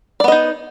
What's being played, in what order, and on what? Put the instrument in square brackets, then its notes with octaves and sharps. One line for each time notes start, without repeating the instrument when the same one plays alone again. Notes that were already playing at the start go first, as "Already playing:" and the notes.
[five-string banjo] D5
B3
D#5
D#4